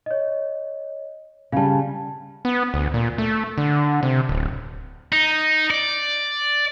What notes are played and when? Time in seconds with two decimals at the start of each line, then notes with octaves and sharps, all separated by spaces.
0.06 C#5 D#5
1.52 C#3 G3 F5 A5
2.45 B3
2.74 D2
2.94 A#2
3.18 A3
3.58 D3
4.03 C3
4.29 D1
5.12 D#4
5.70 D5